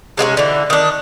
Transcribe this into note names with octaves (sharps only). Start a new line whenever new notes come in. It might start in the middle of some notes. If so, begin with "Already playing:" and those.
C3 G#3 B3 C#4
D3 E3
D#3 D4